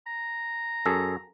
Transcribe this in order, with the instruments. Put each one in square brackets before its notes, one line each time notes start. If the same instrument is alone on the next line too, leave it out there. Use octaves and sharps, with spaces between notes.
[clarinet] A#5
[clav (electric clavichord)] F#2 G#4 A4